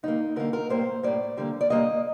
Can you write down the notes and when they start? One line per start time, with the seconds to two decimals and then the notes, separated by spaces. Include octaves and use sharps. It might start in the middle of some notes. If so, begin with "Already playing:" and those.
0.03 D3 G3 A#3 D#4
0.36 D3 G3 A#3 A#4
0.53 A#4
0.69 A2 G3 A#3 C5
1.03 A2 G3 A#3 D5
1.37 D3 G3 A#3
1.61 D5
1.70 D3 G3 A#3 D#5